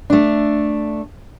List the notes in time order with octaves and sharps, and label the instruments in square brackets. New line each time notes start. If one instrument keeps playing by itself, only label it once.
[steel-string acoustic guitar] A3 D4